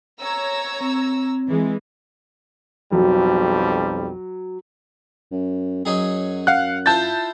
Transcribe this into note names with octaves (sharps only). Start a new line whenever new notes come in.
C#5 A#5 E6
C4
E3 G#3
B1 F2 F#3 G3
F#2
F#2 F#3 D#4 G#4
F5 F#5 F#6
E4 F4 C5 A5 G6 A6